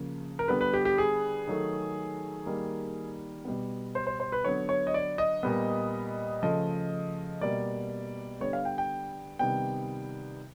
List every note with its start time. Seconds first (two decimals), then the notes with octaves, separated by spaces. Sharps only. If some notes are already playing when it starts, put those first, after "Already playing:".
Already playing: C#3 F3 A#3
0.39 A#4
0.48 D3 G3 B3 B4
0.61 B4
0.74 G4
0.85 G4
0.98 G#4
1.47 D#3 F#3 A3
2.46 D#3 G3 A#3
3.45 B2 G3 B3
3.95 C5
4.07 C5
4.20 C5
4.32 B4
4.44 D3 F#3 B3 C#5
4.69 C#5
4.87 D#5
4.94 D5
5.18 D#5
5.43 A#2 G3 B3
6.42 C#3 F3 A3 D#5
7.41 B2 G3 A#3 D5
8.40 D3 G3 B3 C#5
8.53 F5
8.65 G5
8.78 G5
9.39 C3 D#3 G3 B3 G5